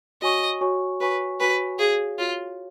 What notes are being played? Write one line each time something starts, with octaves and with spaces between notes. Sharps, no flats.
F#4 C#5 D#5 G#5 C#6
F#4 C#5 G#5 C#6
F#4 B4 C#5 G#5 C#6
F#4 B4 C#5 G#5 C#6
F#4 G#4 C#5 F5
F4 F#4 C#5 F5